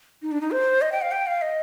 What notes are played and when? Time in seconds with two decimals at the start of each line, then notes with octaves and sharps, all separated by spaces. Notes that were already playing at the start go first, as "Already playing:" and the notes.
0.22 D#4
0.32 D4
0.41 D#4
0.51 C5
0.81 D#5
0.92 G5
1.02 F5
1.12 G5
1.27 F5
1.42 D#5